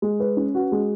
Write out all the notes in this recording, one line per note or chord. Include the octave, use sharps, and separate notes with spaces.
G#3
B4
C#4
F#4
G#3